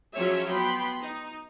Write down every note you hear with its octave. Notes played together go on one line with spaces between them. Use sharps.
F3 F#3 C#4 G#4 C#5 E5
B3 G5 B5 C6
D#4